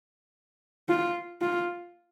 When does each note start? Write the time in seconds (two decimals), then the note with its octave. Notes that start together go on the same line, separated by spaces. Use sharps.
0.89 F4
1.42 F4